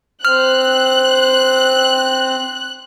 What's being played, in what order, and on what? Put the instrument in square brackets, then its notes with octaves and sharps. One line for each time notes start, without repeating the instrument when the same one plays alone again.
[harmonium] C4 [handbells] F6 [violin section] F#6